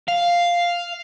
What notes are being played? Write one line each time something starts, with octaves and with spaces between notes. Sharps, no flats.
F5